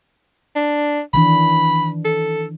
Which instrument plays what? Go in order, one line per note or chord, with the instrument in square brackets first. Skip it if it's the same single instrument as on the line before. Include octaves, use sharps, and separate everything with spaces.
[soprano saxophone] D4
[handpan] D#3 E3 D4 [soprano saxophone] B5
[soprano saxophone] A4